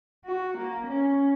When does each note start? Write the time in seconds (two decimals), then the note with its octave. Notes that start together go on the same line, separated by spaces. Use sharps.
0.25 F#4
0.58 A#3
0.88 C#4